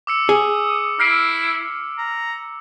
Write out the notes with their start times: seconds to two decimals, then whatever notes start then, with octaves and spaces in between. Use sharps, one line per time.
0.07 D6 E6 C#7
0.29 G#4 D#6
1.00 E4 F6 C7 D7
1.98 A#5